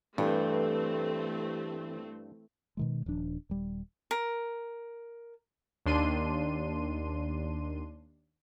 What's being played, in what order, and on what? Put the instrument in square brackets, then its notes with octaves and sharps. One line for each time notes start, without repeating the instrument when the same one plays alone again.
[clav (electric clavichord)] G2 [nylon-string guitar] E3 [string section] A3 C4 [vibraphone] G4 A4
[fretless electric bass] B2 D#3 G#3
D#1 F3 D4
D#1 G3
[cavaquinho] A#4
[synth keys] D#2 D4 C6 D#7